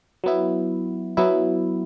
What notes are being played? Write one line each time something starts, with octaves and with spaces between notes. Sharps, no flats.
F#3 B3 E4
F#3 B3 E4